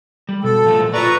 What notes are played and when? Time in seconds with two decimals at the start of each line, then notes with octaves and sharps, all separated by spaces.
0.29 G3
0.44 B2 A4
0.65 A#2 F3 A3
0.94 F4 B4 D5 A#5 C#6